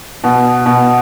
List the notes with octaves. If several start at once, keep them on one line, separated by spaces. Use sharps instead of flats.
B2
B2